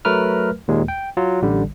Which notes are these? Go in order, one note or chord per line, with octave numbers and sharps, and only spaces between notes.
F#3 A3 A#4 B4 F6
D#2 A#2 G#3
G5
F#3 F4
A1 D3 G3